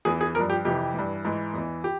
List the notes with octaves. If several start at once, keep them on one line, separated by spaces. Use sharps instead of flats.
E2 E3 G#4
G#4
G2 F3 A#4
G4
F2 C3 E3 G4
G2 E3
G#2 E3
E2 E3
G4